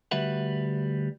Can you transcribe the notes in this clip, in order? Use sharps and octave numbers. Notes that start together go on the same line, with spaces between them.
D2 G3 F#4 B4 E5 F#5